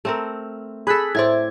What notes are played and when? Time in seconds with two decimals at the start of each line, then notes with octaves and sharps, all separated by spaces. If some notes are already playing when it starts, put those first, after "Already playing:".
0.05 A3 C4 A#4
0.87 G#4 A4 B5 F#6 B6
1.15 A2 C5 D5 E5 G#6